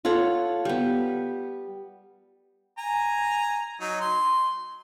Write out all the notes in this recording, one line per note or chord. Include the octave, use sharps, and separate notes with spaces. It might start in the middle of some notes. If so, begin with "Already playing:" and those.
F4 A4 C#5 F#5
G3 B3
G#5 A#5
F#3 D#4
C6